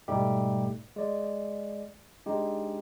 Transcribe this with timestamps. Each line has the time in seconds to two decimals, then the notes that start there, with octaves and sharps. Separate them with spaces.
0.08 G#2 B2 G3 A3 D#4 G4
0.96 G#3 D5
2.26 G#3 D4 D#4 G4